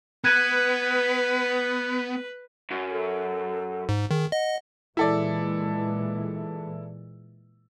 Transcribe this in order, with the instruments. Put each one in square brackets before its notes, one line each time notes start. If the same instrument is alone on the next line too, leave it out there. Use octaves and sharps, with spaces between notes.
[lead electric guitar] B3 [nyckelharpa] B4 [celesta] F#6 G#6 D#7
[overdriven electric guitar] F#2
[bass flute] A4
[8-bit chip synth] G#2
[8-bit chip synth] D#3 [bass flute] G#4
[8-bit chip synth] D#5 [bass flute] F#5
[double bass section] A#2 E3 G#3 [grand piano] E4 A4 D5